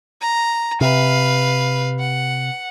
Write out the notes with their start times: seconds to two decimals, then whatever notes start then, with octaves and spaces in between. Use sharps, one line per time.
0.21 A#5
0.81 C3 B4 F5
1.99 F#5